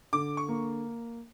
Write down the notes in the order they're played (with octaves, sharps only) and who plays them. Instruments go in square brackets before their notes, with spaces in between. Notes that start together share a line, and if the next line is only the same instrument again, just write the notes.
[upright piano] D3 [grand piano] D6
[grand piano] C#6
[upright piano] A#3